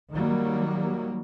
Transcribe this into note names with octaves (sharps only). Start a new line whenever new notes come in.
D#3 F#3 G3 A#3